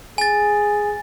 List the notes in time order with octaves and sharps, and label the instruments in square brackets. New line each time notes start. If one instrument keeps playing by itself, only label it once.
[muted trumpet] G#4 [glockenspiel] G#5 A6